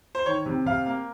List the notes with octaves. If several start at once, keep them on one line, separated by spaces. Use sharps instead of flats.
C5
D#3 C#5
C3
C3 F5
A#3